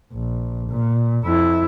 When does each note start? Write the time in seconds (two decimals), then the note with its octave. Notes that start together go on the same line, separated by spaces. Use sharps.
0.13 A#1
0.70 A#2
1.26 F2 E4